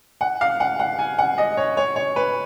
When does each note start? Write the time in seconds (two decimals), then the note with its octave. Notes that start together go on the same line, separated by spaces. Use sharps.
0.21 F#5
0.41 F5
0.60 F#5
0.79 F#5
0.99 G#5
1.18 F#5
1.38 D#5
1.57 C#5
1.77 C#5
1.96 C#5
2.16 B4